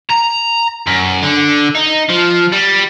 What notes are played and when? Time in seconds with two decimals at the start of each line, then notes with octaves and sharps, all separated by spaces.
0.10 A#5
0.87 F#2
1.23 D3
1.75 D#4
2.09 F3
2.53 G3